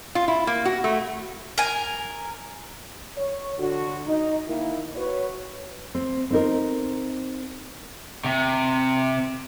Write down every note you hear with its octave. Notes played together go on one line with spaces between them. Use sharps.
F4
E4
A#3
F#4
A3
A#4 G#5
C#5
D3 F#4
D#4
D#3 A#3 E4
F#4 B4 C#5
C4
C4 D#4 A#4
C3